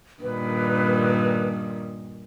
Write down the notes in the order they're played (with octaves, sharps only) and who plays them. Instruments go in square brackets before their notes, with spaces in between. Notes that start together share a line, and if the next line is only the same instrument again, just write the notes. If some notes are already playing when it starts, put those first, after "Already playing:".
[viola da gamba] G2 A#2 D#3 [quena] B4